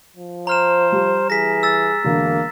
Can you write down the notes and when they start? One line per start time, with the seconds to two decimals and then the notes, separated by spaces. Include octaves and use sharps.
0.17 F3
0.47 C5 A#5 F6 E7
0.92 G3
1.30 E3 G#4 A#6 B6
1.63 E6 A6
2.05 E1 D3 A#3